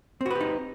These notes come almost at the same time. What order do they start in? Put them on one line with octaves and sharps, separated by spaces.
C4 F#4 B4 G4 D#4